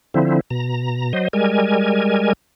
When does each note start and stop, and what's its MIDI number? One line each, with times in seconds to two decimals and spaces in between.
0.14 0.41 50
0.14 0.41 53
0.14 0.41 60
0.14 0.41 64
0.51 1.13 47
0.51 1.13 82
1.13 1.28 54
1.13 1.28 72
1.13 1.28 75
1.33 2.33 55
1.33 2.33 56
1.33 2.33 70
1.33 2.33 80